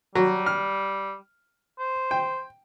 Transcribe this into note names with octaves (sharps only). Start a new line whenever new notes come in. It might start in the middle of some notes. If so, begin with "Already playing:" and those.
F#3 G3
F6
C5
G5